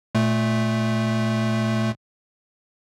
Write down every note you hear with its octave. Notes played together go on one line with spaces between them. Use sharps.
A#2 A3